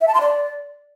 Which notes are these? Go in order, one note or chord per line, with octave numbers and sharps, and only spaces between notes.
E5
A5
C6
D5